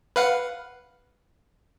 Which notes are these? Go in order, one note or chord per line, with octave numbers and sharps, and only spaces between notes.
B4 F5 F#5